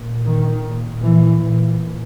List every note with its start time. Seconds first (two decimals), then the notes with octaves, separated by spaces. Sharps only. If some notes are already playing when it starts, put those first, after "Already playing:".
Already playing: A#2
0.24 D#3
0.63 A#2
1.01 E3
1.40 A#2